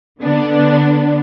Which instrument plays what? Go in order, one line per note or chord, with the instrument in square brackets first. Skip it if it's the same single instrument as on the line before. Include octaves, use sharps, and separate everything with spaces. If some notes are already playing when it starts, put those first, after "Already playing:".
[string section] D3 B3 D4